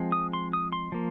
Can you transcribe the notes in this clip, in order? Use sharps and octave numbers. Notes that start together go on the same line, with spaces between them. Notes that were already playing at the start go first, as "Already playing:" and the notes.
Already playing: F3 G#3 C4
D#6
C6
D#6
C6
F3 A#3